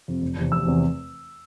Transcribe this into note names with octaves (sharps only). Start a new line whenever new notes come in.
F2 C3
F1
E2 C3
F1 E6
E2 C3